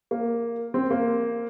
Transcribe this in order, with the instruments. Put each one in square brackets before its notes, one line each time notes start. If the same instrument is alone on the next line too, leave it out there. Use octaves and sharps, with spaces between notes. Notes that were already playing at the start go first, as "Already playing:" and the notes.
[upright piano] A#3
C4
A#3